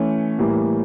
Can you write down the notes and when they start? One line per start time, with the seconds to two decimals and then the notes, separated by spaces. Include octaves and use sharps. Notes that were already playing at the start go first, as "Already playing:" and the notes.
Already playing: E3 A3 C#4
0.39 A2 E3 G3 A#3